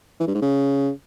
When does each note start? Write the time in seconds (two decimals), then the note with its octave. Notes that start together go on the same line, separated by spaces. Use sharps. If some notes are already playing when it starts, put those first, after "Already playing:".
0.20 E3
0.27 G2
0.35 G#2
0.42 C#3